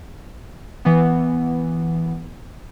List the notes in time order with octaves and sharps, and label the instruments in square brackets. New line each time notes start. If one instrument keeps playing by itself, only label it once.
[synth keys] E3 B3